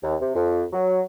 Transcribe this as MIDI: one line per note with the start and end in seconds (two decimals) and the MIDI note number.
0.03 0.16 39
0.20 0.32 48
0.34 0.64 41
0.72 1.01 54